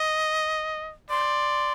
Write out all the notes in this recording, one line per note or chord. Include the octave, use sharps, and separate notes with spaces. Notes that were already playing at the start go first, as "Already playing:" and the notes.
Already playing: D#5
D5 C6